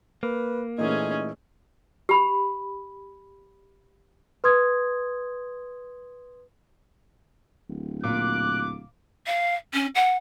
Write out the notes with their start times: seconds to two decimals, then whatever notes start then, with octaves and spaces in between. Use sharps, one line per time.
0.23 A#3 B4
0.78 A#2 E3 A3 C#4 D#4 G#4
2.09 G4 B5
4.44 B4 C6 D#6 G#6
7.69 D1
8.04 A#2 D6 F#6
9.27 F5
9.74 C#4
9.95 F#5